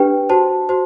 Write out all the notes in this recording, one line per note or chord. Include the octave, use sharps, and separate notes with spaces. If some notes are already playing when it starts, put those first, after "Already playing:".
Already playing: D4 G4 B4 G5
F#4 C5 A5
F#4 C5